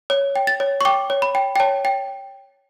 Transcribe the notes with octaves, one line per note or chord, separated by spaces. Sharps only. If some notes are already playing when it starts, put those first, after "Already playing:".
C#5
G5
A6
C#5
C#6
G5 D6
C#5
B5
G5
G5
C#5 A5
G5